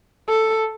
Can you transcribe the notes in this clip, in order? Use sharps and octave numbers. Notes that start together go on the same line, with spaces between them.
A4